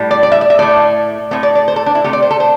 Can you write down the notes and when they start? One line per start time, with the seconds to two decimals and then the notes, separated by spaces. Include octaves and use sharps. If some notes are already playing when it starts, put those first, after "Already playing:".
Already playing: A2 G3
0.11 D5
0.23 D5
0.32 E5
0.41 D5
0.50 E5
0.59 A2 A3 D5
1.31 A2 A3 C4
1.43 D5
1.55 D5
1.68 C5
1.76 A4
1.86 D4
1.95 E4
2.04 C3 A3 G4
2.13 D5
2.23 C5
2.31 A4
2.40 C5